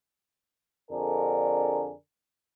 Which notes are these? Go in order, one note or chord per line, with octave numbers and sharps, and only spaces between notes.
F2 D3 D4 G#4 A#4